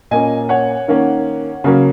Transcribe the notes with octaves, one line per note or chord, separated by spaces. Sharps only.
A#2 A#3 C#4 D#5 G#5
C#5 F#5
D#3 A#3 C#4
C#3 F#3 A#3 C#4